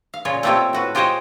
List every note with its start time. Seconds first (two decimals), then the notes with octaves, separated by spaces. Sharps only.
0.14 F5
0.25 A#2 C#3 F4 G#4 C#5
0.43 A3 A#3 C4 F4 G4 C#5
0.73 A2 F#4 B4
0.95 F4 G4 G#4 C5 C#5 D#5